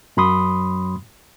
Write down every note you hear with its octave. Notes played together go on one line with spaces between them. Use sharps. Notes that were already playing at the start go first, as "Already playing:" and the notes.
F#2 F#3 B5 C6 D#6